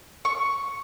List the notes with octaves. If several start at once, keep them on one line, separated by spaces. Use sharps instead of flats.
C#6